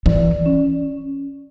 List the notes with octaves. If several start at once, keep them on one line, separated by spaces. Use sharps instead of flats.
E3 D5
C#4